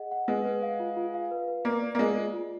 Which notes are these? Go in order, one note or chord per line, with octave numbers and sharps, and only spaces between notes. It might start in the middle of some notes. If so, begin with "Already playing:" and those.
Already playing: G#4 D#5 F#5
F#5
G#3 B4
B4
F5
F4
F4
F5
B4
B4
A#3 D5
D5
A#3
G#3 D5
F4
F4